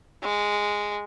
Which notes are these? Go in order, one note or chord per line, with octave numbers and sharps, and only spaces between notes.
G#3